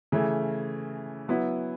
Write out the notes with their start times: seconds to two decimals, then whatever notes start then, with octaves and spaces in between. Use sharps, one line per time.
0.12 C#3 E3 A3
1.28 F#3 B3 E4